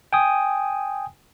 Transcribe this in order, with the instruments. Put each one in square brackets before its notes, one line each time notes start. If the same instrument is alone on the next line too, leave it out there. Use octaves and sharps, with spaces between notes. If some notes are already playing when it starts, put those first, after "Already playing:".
[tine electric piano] G5 G#5 D#6